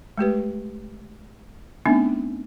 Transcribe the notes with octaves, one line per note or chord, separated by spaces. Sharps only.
G#3 A3 G4 B4
A3 B3 C4 D4 D#4 E5